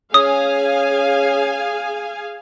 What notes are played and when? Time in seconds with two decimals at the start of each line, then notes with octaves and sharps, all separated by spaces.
0.14 C#4 G#4 F5 G#5 D#6